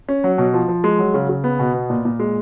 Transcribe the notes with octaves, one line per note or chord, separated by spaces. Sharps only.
C#4
F#3
B2
F3
F3
G#3
F#3
C#3
C#3
B3
B2
B3
A#2
A#2
G#3